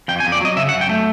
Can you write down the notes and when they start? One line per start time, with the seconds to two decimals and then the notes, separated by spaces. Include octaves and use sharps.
0.08 F2 G5
0.20 G#5
0.25 F2
0.32 D5
0.40 F#3 D#5
0.57 C#3 E5
0.69 F#5
0.73 F#2
0.81 G5
0.89 A3